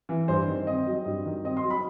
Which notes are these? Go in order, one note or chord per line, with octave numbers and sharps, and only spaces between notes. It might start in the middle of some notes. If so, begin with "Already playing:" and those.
E3
G2 C5
D#3
C4 D#5
F#3
G2
D#3
C4 D#5
C6
F#3
B5